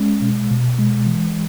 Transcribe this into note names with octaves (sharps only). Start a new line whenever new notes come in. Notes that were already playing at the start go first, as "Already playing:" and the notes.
Already playing: G#3 C#4
B2
B2
G#3
E3